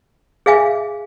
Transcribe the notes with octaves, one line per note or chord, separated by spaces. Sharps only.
G#4 E5 F5 G#5